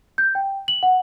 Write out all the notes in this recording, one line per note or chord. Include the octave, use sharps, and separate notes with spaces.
G6
G5
F#7
F#5